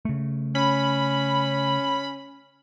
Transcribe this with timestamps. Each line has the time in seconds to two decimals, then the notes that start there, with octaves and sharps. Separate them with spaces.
0.05 C#3 A3
0.55 C#4 B5